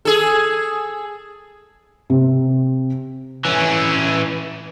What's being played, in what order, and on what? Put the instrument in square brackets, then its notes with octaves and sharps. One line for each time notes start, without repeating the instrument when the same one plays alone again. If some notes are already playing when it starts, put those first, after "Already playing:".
[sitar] G#4 A4
[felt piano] C3
[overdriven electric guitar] E3 C#4